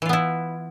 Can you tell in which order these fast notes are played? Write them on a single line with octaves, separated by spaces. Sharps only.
E3 F4 B3 E4